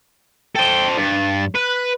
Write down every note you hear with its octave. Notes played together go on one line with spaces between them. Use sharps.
A4 C5 G5
G2 A6
B4 F#6